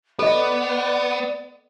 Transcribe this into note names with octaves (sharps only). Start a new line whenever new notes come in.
B3 A4 D5 D#5